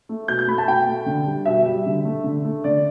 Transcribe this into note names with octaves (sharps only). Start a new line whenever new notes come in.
A3
B2 G6
G6
A3 B5
A5
B2 G5
A3
D3
G3
B2 E5
G3
D3
A3
D3
A3
D3 D5